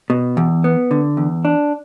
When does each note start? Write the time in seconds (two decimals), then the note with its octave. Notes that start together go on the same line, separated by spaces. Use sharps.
0.10 B2
0.37 E2
0.64 B3
0.91 D3
1.17 E2
1.45 D4